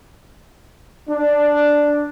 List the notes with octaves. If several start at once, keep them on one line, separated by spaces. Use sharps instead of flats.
D4